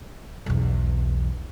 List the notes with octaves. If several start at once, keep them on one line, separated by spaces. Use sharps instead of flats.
B1 E2